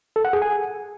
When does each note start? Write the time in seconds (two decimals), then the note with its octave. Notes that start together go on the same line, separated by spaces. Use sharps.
0.16 A4
0.25 F#5
0.33 G#4
0.42 G#5